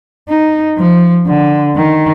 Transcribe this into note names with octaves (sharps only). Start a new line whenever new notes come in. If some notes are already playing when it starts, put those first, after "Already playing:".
D#4
F3
D3
D#3